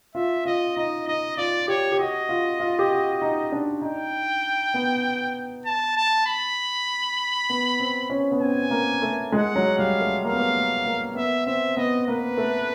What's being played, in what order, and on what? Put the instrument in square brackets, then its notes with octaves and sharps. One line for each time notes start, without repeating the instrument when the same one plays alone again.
[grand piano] F4 [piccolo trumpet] E5
[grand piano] F4 [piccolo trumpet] D#5
[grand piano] D#4 [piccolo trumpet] D#5
[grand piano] D#4 [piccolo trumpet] D#5
[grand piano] F4 [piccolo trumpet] D5
[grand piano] G4 [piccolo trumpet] C#5
[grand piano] G4
[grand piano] F#4 [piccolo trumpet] D#5
[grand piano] F4
F4
G4
F#4
D#4
D4
[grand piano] D#4 [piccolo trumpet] G5
[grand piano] B3
[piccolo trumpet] A5
A5
B5
[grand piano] B3
C4
C#4
B3
[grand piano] C4 [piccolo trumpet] G#5
[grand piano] A#3
A3
[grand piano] G#3 [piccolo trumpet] F#5
[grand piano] F#3
[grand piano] G3 [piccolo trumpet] F5
[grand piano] A3
[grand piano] A#3 [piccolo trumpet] F5
[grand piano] B3
A#3
A3
A#3
[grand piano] B3 [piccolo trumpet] E5
[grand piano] C4 [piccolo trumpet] E5
[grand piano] B3 [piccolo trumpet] D#5
[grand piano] A#3 [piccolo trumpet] B4
[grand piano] A3